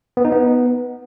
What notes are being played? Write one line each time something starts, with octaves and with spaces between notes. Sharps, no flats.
B3
D#4
B3